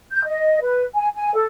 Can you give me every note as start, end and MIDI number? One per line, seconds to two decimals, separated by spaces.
0.11 0.21 91
0.25 0.59 75
0.62 0.83 71
0.94 1.08 80
1.15 1.33 80
1.34 1.45 69